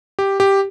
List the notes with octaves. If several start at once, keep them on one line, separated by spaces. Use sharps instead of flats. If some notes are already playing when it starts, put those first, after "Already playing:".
G4
G4